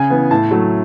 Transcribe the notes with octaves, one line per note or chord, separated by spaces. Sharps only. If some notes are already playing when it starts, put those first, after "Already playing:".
Already playing: C#3 G#5
E3 B3
A2 A5
F#3 A3